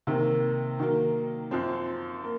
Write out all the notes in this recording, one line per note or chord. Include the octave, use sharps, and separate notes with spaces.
C3 D#3 A#3
D#3 F#3 A#3
F#2 F3 C4
A#3